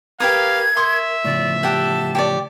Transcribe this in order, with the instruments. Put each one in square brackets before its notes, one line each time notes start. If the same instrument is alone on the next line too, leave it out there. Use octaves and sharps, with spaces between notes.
[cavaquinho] G4 B4 D#6 [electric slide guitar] A#4 [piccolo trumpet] F5 [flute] G#6
[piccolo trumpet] E5 [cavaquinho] C6 C#6 D#6
[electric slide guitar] A2 C#3 F3 [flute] D5
[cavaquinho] G4 F#5 [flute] A5
[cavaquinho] G4 C#5 D5